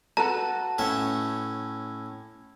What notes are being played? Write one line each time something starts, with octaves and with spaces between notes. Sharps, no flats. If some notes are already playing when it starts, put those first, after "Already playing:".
F#4 A4 B4 A5 A#5
A2 C#4 E5